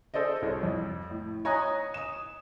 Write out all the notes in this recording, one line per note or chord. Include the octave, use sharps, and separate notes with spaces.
G#4 A4 C5 D5 D#5
C2 C#5
F2
A2
C#5 D#5 G#5 A#5 D#6 F#6
D#6 E7